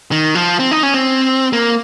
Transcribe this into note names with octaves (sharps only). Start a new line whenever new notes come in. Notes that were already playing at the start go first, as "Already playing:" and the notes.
D#3
F3
C4
D#4
C#4
C4
A#3